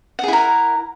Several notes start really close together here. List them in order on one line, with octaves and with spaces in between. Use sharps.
F#5 G#4 E4 A#4